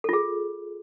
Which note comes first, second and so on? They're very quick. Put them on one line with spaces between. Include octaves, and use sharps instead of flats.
A4 F4 G#4